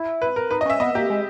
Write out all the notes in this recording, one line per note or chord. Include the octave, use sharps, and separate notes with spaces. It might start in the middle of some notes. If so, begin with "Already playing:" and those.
Already playing: E4
B4
A#4
D#4 B4
D#5
C#4 E5
B3 D#5
A#3 G4
G#3